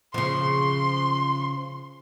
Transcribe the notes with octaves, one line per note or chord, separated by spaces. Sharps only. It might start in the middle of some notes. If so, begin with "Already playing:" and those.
C#3 F3 C6